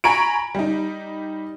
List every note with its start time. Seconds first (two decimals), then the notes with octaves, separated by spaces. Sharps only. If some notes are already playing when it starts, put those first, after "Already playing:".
0.04 G#5 A#5 B5 C#6 D7
0.55 G3 D#4